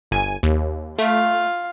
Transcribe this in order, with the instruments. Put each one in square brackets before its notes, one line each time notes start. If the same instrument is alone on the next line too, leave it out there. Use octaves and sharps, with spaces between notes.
[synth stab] G1 G#5
D#2
[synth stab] A3 [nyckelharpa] F4 F5